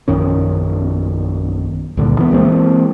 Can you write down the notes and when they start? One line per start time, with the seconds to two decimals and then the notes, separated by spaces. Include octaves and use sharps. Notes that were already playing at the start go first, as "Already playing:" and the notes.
0.08 A#1 F#2 D#3 C#4
1.97 C#2 G2 A#2 D3
2.18 E3 B3
2.31 E3 G#3 A#3 C4